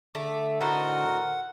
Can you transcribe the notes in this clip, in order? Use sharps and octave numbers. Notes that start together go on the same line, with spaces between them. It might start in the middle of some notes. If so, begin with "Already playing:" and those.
D3 A3 D6
A2 D#4 F#4 A#4 C5 F#5